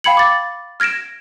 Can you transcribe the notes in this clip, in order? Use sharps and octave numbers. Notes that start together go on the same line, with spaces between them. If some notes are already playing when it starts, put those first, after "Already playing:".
F5 G5 B5 G#6 C#7 F#7
D6 A6
F6 G#6 A#6 D7 E7